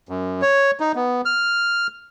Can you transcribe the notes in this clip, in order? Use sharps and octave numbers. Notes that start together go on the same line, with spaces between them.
F#2
C#5
D#4
B3
F6